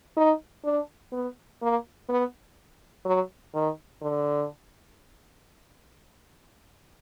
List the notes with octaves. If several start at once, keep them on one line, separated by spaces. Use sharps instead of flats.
D#4
D4
B3
A#3
B3
F#3
D#3
D3